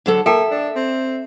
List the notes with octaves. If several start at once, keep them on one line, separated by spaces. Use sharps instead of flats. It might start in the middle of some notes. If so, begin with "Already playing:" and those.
D3 F#3 A4
A#3 A4 E5 G5 A5
D4
C4